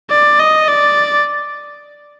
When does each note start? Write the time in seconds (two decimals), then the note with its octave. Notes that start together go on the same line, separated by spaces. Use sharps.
0.11 D5
0.40 D#5
0.68 D5